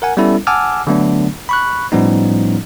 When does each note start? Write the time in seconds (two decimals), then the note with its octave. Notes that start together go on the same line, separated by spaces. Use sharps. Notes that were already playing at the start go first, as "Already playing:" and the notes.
0.02 A#4 F#5 G#5
0.17 G3 B3 C#4 E4 A4
0.47 F#5 G#5 A5 D6 E6 F6
0.87 D3 F#3 A3 B3 D4
1.49 B5 C#6 F#6
1.92 A2 F3 G3 B3 C#4 D#4